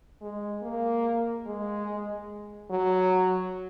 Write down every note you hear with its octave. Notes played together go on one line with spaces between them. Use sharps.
G#3
A#3
G#3
F#3